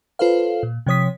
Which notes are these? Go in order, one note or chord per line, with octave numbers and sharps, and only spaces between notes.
F4 A4 B4 C5 F5
A#2
C3 F3 C#5 D#6 B6